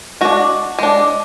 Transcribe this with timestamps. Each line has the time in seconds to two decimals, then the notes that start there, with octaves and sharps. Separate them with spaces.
0.21 G#3 D4 F#4
0.79 G#3 D4